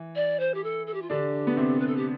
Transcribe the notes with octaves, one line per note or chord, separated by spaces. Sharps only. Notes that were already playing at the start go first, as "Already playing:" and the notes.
Already playing: E3
D5
C5
G4
A4
A4
G4
F4
D3 D4 G4
B3
C3 C4
B4
A4
G4